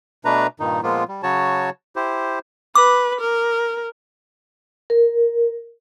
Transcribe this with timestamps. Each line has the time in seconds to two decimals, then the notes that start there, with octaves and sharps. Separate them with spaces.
0.25 B2 A3 D4 B4 A#5
0.60 G2 A#2 D#3 D#4
0.83 A#2 F3 G#3 A#3 B3 F4
1.08 G3
1.23 C#3 F#3 F#4 C#5 A5
1.96 E4 G4 C5
2.75 B4 D6
3.20 A#4
4.90 A#4